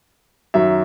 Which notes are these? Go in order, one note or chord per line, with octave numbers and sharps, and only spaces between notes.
F#2 D#3 F#3 E5